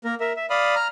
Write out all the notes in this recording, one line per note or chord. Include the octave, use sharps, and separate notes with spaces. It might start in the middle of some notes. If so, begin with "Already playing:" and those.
A#3 A#4
A#4 E5
E5
D5 F5 B5 D#6
A#5 F6